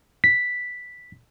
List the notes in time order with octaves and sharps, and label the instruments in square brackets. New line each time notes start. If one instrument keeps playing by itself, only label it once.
[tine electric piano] B6